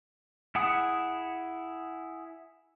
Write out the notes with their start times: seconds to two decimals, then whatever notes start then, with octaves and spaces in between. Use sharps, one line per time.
0.55 E4 G#4 F#5 D#6